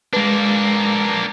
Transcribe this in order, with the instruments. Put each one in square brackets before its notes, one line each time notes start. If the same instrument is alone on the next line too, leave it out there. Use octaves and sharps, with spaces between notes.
[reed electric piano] G#3 B4 [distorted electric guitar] A#3 D4